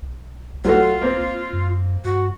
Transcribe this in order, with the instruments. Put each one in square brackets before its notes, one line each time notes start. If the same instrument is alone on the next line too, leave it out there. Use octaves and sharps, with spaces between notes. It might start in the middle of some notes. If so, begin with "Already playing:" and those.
[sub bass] B1
[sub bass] B1 [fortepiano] F#3 A3 F#4 [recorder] F4
[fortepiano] A#3 C4
[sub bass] F#2
[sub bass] G2 [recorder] F#4